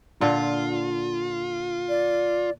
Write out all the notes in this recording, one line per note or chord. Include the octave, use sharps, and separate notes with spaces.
A#2 D3 F4
D5